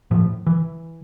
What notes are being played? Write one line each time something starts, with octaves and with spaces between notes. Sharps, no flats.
A2 F3
E3